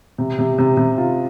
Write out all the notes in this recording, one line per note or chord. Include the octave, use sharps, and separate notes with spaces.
C3
C3
C3
C3
F4